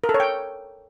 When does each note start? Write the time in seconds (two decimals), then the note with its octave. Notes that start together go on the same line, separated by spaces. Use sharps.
0.04 A#4
0.09 A4
0.14 C#5
0.20 G5